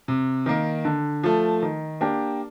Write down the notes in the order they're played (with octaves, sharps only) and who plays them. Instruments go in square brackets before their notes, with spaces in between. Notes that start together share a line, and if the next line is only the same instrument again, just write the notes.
[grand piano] C3
D#3 A#3
D3
F3 A3
D#3
A#3 D4 G4